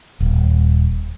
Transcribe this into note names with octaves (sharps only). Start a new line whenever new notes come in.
D#1